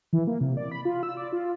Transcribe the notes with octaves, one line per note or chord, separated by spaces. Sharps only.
E3
A#3
C3
D5
B5
F4
E6
D5
F4